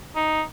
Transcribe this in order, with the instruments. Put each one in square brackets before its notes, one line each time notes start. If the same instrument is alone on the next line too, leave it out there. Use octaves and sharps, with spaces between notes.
[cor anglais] D#4